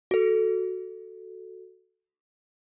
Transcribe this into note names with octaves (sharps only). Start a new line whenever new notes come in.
F#4 A4